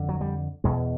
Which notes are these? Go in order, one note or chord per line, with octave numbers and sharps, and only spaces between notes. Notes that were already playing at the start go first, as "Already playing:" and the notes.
Already playing: F2 D3
F#3
G3
E2 B2 G#3